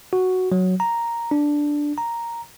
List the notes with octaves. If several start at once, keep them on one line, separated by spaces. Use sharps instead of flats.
F#4
F#3
A#5
D4
A#5